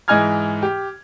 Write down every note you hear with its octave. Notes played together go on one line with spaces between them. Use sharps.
G#2 E3 D#5 G#5 F6 G#6
G4